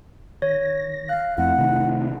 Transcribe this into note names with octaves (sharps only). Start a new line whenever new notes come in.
D#3 C#5 A#6
F5 F#6
F2 A3 C4 E4 F#5
C3 D#3